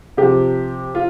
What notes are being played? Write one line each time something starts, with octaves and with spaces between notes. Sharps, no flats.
C3 F3 G4
F4